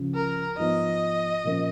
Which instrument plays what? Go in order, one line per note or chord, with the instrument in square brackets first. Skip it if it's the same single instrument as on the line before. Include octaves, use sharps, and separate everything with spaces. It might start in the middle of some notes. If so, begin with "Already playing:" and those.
Already playing: [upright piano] C#2 C#3 F3
[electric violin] A#4
[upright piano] G#2 F3 B3 [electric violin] D#5
[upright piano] A#2 F3 A#3 C#4